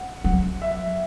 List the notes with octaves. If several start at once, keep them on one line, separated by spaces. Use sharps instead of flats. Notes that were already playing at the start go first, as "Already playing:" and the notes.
Already playing: F#5
F#3 F#5
E5